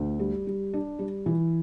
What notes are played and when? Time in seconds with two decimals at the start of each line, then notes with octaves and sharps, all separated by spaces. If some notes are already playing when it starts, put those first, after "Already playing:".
Already playing: D2
0.20 G3
0.47 G3
0.73 D4
0.99 G3
1.26 E3